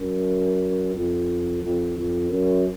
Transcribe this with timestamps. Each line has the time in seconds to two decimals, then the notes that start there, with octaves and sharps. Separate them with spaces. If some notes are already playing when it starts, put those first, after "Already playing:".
Already playing: F#2
0.95 F2
1.63 F2
1.96 F2
2.30 F#2